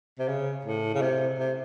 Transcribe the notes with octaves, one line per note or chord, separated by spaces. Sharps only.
C3
C#3
A2
C#3
C3
C3